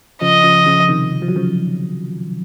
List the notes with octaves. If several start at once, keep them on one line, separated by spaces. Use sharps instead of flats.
C#3 F3 D#5
C#3 F3
C#3 F3
C3 D#3
F3
F#3
C#3 F3